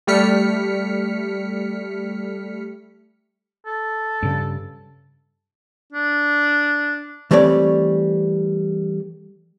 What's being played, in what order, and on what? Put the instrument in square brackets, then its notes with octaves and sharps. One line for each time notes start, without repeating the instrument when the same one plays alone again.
[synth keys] G3 A3 F6 B6 C#7
[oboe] A4
[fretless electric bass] G2 C#3
[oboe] D4
[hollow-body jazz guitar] E3 G3 A3 C4 C#5 D5